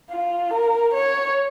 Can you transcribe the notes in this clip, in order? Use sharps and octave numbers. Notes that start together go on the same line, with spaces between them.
F4
A#4
C#5